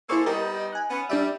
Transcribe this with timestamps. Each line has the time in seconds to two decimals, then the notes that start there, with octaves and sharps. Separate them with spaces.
0.10 A#3 E4 G#4 A4 C5 C#6
0.26 G3 B3 D#4 G4 A#4
0.73 G#5 F#6
0.90 B3 C#4
1.10 G3 D4 D5 E5